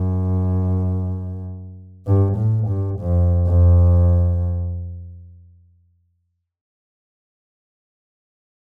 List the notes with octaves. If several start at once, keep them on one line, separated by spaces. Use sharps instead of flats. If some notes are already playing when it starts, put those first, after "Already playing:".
Already playing: F#2
G2
A2
G2
F2
F2